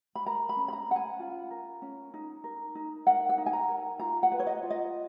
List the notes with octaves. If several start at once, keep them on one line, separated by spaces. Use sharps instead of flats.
B5
A#4 A#5
B5
C#4
B5
A#5
C#4 F#5
G#5
F4
A#4
C#4
D#4
A#4
D#4
A#4 F#5
F#5
D#4
G#5
A#5
A#4
F4 A#5
F#5
B4
C#5
D#5
F4
D#5